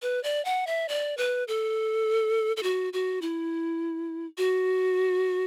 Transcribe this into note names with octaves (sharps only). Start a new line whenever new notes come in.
B4
D5
F#5
E5
D5
B4
A4
A4
F#4
F#4
E4
F#4